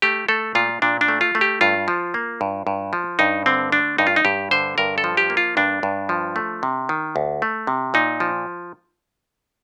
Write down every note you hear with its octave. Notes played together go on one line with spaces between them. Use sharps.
A3 G4
A3 A4
A#2 F4
A#2 D4
D4
A3
F4
A3
G4
G2 F4
F3
A#3
G2
G2
F3
G2 D#4
D3 C4
A3 D4
G2 D#4
F4
D#4
G2 G4
D3 C5
G2 A#4
A4
F3
G4
A#3
F4
G2 D4
G2
F3
A3
C3
D#3
D2
A3
C3
A#2 D#4
F3